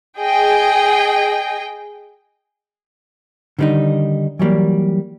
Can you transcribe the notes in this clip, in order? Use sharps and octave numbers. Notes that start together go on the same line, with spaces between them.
G#4 D#5 G5
D3 D#3 G3 C#4 D#4
E3 F#3 G3 A#3